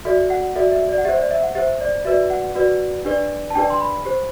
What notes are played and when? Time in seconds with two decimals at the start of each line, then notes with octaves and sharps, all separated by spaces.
0.05 F#4 A4 D5 E5
0.30 F#5
0.55 F#4 A4 D5 E5
0.72 E5
0.89 D5
0.98 F#5
1.05 G4 C5 E5
1.18 D5
1.31 E5
1.43 F#5
1.55 G4 C5 E5
1.81 D5
2.05 F#4 B4 D5 E5
2.30 F#5
2.55 F#4 B4 D5
3.05 D4 G4 B4 D5
3.50 A5
3.55 D4 G4 B4 D5 G5
3.70 C6
3.81 B5
4.05 G4 C5